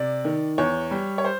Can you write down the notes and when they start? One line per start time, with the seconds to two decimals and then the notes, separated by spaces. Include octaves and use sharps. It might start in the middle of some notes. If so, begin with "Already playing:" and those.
Already playing: C3 D5
0.25 D#3
0.58 E2 C#5
0.91 G3
1.18 C#5
1.24 C5